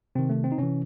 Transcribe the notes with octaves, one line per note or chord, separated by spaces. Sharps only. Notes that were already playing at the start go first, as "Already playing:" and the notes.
C3 D#3 C4
A3
C4
D#4
C3 E3 C#4